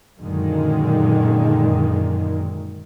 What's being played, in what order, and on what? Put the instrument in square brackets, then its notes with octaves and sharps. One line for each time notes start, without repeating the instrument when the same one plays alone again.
[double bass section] F#2 A#2 D3 D#3 G#3